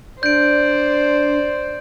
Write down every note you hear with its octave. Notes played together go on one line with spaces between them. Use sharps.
D4 C5 D5 G6 D7